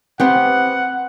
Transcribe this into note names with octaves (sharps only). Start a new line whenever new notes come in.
B3 C4 G4 F#5